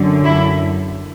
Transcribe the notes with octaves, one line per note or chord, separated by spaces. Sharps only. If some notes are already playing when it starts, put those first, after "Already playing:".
Already playing: F#2 D3
E4